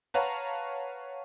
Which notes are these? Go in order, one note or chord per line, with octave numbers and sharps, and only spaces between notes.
B4 C#5 F5 F#5 A5 A#5